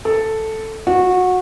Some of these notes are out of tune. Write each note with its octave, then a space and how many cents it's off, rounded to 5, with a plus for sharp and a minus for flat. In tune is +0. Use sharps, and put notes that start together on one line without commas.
A4 +0
F#4 -20